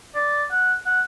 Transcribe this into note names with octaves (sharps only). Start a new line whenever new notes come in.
D5
F#5
F#5